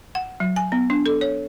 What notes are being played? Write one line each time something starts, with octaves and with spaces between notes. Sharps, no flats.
F#5
F#3
G#5
B3
D4
A4
C#5